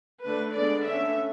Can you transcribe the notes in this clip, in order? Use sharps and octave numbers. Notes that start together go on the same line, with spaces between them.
D3 A3 D4 B4
D3 G#3 B3 D4 D5
D3 A3 C#4 E5